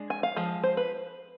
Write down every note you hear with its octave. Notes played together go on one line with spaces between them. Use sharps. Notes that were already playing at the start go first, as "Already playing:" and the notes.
Already playing: G#3 D4
G#5
F5
F3 G#3
C5
B4